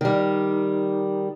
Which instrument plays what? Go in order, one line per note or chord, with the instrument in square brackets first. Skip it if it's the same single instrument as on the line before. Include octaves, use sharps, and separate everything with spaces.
[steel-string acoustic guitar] D#3 G3